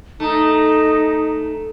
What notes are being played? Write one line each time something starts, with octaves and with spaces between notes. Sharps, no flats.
A3 D#4